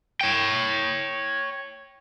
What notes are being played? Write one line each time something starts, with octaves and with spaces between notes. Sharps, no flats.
C#5 G5